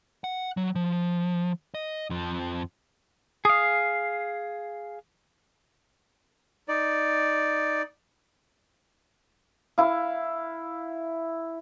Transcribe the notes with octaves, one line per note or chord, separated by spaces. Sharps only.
F#5
F#3
F3
D#5
F2 F3
G#4 F5 D#6
D#4 D5
E4 F5